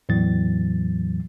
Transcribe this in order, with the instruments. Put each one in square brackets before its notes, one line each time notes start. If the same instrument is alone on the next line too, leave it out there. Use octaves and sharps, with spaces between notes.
[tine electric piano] E2 A2 E3 F#3 A6